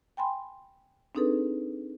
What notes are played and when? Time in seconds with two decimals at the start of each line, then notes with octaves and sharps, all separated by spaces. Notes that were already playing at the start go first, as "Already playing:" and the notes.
0.17 G5 G#5 B5 C6
1.15 C4 D4 D#4 G#4 A4 B4